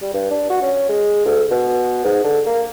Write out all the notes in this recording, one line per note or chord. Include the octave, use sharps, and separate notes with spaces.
G3
G2
D4
F#4
C#4
G#3
D2
B2
G#2
D3
A#3